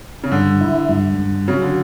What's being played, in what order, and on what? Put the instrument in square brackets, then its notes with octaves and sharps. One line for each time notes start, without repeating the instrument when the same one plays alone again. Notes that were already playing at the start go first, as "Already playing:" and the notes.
[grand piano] C#3
[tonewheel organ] G2 [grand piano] D3
[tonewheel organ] E4
G2
G2
[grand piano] C#3 [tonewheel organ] F#3
[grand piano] D3